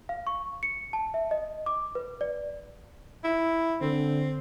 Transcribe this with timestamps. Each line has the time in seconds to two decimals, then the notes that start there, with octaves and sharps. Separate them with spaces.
0.09 F5
0.27 C#6
0.63 C#7
0.93 A5
1.14 E5
1.31 D#5
1.66 D6
1.95 B4
2.21 D5
3.24 E4
3.81 D3 C4